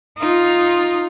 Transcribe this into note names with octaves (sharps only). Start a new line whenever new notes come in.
D#4 F4